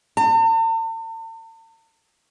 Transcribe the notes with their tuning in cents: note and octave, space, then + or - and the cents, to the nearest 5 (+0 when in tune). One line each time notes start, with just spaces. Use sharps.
A5 +45